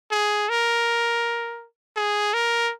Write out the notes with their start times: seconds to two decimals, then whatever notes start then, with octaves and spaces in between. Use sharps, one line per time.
0.12 G#4
0.49 A#4
1.96 G#4
2.34 A#4